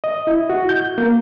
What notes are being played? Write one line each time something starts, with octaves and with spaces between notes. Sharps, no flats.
D#5
E4
F#4
G6
A#3